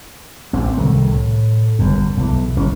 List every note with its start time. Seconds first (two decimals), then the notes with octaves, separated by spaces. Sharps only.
0.53 A1 C4
0.77 C2 D#3 A3
1.08 A2
1.79 G1 F#2
2.17 B1 E3
2.57 G1 E3 C#4